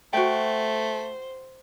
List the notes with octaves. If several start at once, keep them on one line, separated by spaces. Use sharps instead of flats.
A3 F#4 C5 G5